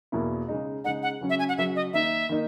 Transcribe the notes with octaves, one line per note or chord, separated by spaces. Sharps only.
E2 B2 A#3 E4
C#3 G#3 D#4
C#3 G#3 D#4 F#5
F#5
C#3 F#3 C#4
E5
G#5
F#5
C#3 F#3 C#4 E5
D#5
D#3 A#3 D#4 E5
D#3 A#3 D#4